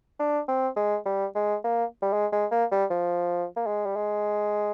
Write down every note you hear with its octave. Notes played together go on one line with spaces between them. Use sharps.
D4
C4
G#3
G3
G#3
A#3
G3
G#3
G#3
A#3
G3
F3
A#3
G#3
G3
G#3